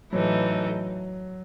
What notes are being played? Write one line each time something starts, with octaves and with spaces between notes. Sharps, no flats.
A2 E3 F#3 A3 D#4